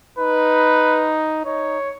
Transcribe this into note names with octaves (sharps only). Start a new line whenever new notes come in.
D#4 B4
D#4 C#5